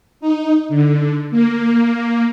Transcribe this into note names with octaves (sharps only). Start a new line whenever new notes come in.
D#4
D3
A#3